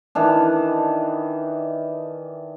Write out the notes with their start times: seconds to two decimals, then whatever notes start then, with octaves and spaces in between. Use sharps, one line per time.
0.15 D#3 E3 D4